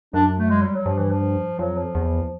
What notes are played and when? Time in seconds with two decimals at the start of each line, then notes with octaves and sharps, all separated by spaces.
0.13 F#2 D4
0.39 A3
0.50 G#3
0.62 G3
0.75 F#3
0.86 G2 F3
0.98 E3
1.11 F3
1.59 F2 F#3
1.77 F3
1.95 E2